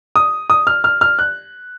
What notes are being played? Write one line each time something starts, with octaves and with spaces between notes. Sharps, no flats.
D#6
D#6
F6
F6
F6
F#6